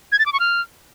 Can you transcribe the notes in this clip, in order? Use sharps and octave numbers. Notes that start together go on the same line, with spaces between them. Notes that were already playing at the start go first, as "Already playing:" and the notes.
G#6
A6
D6
C#6
F6